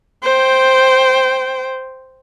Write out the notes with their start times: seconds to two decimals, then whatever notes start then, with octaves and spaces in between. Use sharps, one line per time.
0.23 C5 G5